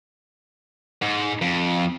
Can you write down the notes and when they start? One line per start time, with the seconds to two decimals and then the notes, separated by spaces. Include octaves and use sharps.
1.02 G#2
1.42 F2